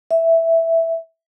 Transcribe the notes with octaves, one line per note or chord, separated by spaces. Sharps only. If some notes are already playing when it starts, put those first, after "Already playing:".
E5